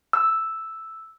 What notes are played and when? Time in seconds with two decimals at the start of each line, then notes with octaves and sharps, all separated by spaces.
0.13 E6